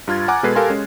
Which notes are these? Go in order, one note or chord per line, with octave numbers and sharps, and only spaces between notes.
G2 F4 F6 G#6 A6
F#5 G#5 A#5 D6 F#6
B2 G#3 A4 B4 G#6 C7
G4 A4 A#4 F5 G#5 C6
G#3 C#4